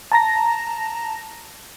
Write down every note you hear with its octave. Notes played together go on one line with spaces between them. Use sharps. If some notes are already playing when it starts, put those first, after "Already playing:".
A5 A#5 A#6